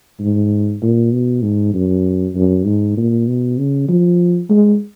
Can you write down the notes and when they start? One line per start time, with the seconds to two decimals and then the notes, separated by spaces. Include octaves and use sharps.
0.20 G#2
0.82 A#2
1.12 B2
1.43 G#2
1.74 F#2
2.35 F#2
2.66 G#2
2.97 A#2
3.27 B2
3.58 C#3
3.88 F3
4.50 G#3